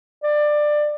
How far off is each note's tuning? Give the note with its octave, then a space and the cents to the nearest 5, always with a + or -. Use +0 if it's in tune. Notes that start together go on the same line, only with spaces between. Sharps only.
D5 +20